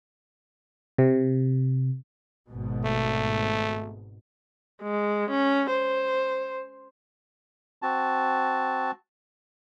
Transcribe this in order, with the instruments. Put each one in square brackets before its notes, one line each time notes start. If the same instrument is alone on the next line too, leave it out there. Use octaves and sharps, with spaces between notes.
[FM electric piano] C3
[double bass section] G#1 G#2 B2
[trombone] A3
[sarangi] G#3
C#4
C5
[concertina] C4 F#4 A5